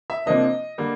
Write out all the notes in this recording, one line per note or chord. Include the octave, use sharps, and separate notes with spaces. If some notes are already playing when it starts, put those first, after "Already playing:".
E5
C3 F3 A#3 D4 D#5
D3 G3 A#3